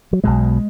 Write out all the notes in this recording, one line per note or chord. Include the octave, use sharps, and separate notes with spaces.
F#3
B1 B2 G#3